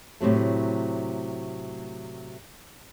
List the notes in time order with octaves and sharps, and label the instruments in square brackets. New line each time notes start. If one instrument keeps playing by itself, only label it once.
[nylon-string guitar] A2 C3 F#3 A3